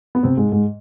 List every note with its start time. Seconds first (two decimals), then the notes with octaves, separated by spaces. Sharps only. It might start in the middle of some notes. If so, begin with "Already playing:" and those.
0.15 B3
0.23 C3 C4
0.37 G#2 G#3
0.52 G#2 G#3